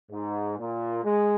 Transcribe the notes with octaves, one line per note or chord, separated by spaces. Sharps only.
G#2
A#2
G#3